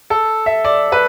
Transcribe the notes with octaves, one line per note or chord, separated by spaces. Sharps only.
A4
E5
D5
B4